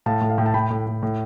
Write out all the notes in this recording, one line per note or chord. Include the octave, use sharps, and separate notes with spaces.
A2 F5 A5
A2
F5
A2 G5
A5
A2 G5 B5
A2
A2
A2